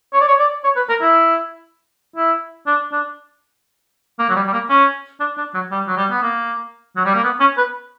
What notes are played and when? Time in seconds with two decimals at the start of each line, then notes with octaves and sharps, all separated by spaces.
0.13 C#5
0.21 D5
0.28 C#5
0.39 D5
0.64 C#5
0.76 B4
0.89 A#4
1.02 E4
2.16 E4
2.67 D4
2.92 D4
4.19 A#3
4.29 F#3
4.36 G3
4.47 G3
4.53 A#3
4.70 C#4
5.20 D4
5.38 D4
5.54 F#3
5.71 G3
5.87 F#3
5.97 G3
6.10 B3
6.22 A#3
6.96 F#3
7.06 G3
7.15 A#3
7.24 B3
7.40 C#4
7.57 B4